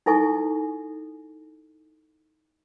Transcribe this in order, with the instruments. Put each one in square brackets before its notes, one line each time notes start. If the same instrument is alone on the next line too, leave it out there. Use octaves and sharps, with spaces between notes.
[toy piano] D#4 E4 A4 G#5 C#6